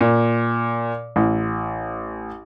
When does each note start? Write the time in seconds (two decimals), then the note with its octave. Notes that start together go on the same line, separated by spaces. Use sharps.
0.01 A#2
1.16 A1